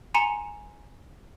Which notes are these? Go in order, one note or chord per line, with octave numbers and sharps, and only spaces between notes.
G#5 A#5 C6 C#7 E7